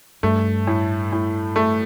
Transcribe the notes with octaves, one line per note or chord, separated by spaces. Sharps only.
G2 A3
A2
A2
A3